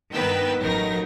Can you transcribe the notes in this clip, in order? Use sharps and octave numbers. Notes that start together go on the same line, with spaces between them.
G2 D#3 B3 B4 G5 E6
A1 F#3 D#4 A#4 A#6